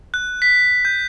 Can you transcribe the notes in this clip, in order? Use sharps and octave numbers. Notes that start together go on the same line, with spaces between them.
F#6
B6
G6